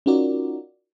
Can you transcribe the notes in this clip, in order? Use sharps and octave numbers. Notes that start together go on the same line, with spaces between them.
C#4 D#4 F4 F#4 A#4 D5